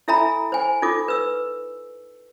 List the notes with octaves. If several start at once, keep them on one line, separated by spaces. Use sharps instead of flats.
E4 A4 E5 G#5 A#5 B5
C5 G#5
D#4 F4 A4 D6
B4 E6